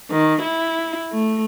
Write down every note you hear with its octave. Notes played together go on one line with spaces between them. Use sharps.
D#3
E4
A3